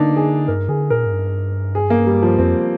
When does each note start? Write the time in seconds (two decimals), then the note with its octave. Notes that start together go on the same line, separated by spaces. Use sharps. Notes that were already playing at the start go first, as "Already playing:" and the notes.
Already playing: D3 A#3 D4 D#4
0.16 G#4
0.48 G2 A#4
0.69 D3 G#4
0.90 A#2 A#4
1.06 G#2
1.12 G2
1.75 G#4
1.90 A#3
2.07 G3
2.22 F3
2.38 F2 C4